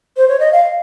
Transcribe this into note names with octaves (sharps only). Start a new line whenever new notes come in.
C5
C#5
D#5
F5